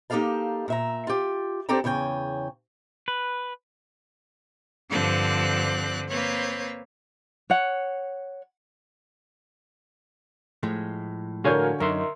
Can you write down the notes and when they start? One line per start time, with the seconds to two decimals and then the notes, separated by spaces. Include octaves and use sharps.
0.10 A#3 D#4 G4 A4 F5 A5
0.68 A#2 E5 A#5
1.07 F4 G4
1.69 C4 D4 G4 A4 G5 A#5
1.84 E2 C#3 C#5 G5 G#5
3.08 B4
4.89 G2 D3 F3 C4 D5 F#6
6.09 A#3 C4 B4 C#5
7.50 C#5 F#5
10.63 A2 F3 G#3
11.44 D3 F#4 A#4 C#5 F5 G#5 G6
11.80 F#2 D#4 A#4 E5 C6